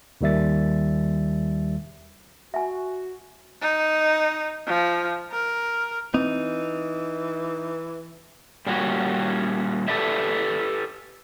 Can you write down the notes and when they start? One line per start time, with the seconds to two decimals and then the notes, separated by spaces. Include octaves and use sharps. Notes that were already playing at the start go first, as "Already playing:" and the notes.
0.21 D#2 D#3 G3 E5 A6
2.54 F#4 E5 G#5
3.62 D#4
4.67 F3
5.32 A#4
6.14 E3 C4 D#4
8.67 A#2 G3 C#4 F#4
9.88 G4 A4 B4 D5 E5